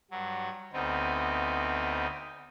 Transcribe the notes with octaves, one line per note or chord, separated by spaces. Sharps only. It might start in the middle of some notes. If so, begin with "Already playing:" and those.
G2 F#3
D2 B3 C4 D#4